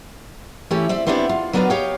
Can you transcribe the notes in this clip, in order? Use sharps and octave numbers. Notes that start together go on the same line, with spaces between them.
E3 A3 C#4 E4 G4
C4 D5 E5
B3 C4 D4 E4 F#4 G4
F4
F#3 B3 D4 F4 A#4 B4
G4 C#5 D#5 F5 G5